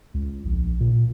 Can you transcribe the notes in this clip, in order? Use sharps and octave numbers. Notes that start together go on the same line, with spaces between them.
C#2
A#1
A#2